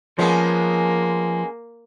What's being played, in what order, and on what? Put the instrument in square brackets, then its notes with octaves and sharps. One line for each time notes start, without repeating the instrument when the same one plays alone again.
[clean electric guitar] F3 [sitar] G#3 B3 C#4 [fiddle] A#3